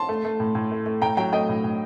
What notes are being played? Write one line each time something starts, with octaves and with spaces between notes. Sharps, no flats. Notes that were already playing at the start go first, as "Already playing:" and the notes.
Already playing: A5 C6
A3
A3
A2
A2
A3
A3
A2 G5 A#5
F#3 G5 A#5
A3 D#5 G5
A2
A2